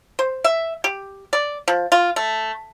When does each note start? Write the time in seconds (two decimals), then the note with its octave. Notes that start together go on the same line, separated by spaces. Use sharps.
0.19 C5
0.44 E5
0.84 G4
1.33 D5
1.68 F3
1.92 F4
2.16 A3